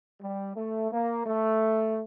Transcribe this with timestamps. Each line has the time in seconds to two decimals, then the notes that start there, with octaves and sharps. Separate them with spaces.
0.21 G3
0.56 A3
0.91 A#3
1.26 A3